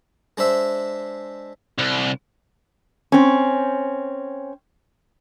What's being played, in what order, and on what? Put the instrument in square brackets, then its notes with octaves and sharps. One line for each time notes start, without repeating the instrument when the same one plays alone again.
[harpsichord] G#3 D4 C5 E5
[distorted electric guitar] C2
[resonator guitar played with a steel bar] C4 C#4